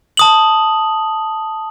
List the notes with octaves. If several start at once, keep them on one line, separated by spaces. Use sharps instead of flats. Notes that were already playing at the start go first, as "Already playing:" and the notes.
A5 D#6 F#7